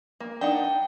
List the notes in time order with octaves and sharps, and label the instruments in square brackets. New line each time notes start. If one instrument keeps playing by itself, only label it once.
[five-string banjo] A#3
[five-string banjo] D4 D#4 F#5 [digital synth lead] G5